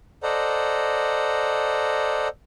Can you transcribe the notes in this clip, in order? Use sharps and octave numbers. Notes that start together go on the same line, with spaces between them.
A4 C5 D5 D#5 F#5 A#5